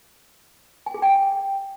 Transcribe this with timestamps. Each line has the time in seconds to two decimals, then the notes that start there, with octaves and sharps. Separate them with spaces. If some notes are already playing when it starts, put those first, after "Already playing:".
0.86 G#5
0.94 G#4
1.02 G5